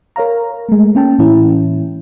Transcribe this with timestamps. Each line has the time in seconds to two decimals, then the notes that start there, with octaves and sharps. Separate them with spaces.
0.16 A#4 C#5 F5 A#5
0.69 G#3 A3
0.95 A#3 C#4 G5 A5
1.19 A2 E3 C#4 E4